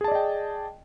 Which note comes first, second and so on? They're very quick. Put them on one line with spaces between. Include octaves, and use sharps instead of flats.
G#4 A5 D5 D#5 G5